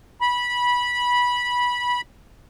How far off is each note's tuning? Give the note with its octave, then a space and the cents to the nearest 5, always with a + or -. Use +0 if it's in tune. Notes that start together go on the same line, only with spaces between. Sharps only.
B5 -15